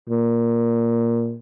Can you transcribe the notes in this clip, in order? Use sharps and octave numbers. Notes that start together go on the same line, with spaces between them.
A#2